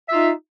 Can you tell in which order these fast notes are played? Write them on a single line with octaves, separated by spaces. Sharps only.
E5 F4 D#4